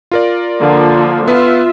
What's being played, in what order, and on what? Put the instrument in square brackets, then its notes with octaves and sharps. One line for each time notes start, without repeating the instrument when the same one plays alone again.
[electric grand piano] F4 A#4 D5
[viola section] D3 F3 A#3
[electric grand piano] B3 B4 [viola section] F4 E5